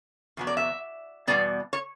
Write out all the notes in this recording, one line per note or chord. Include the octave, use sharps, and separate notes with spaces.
E2 B2 F#3
D5
E5
E2 B2 G3 B3 D5
C#5